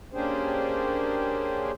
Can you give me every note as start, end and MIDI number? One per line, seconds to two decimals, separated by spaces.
0.13 1.72 58
0.13 1.72 61
0.13 1.72 62
0.13 1.72 67
0.13 1.72 68
0.13 1.72 72